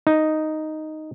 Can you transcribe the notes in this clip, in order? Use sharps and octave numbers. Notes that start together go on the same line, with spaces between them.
D#4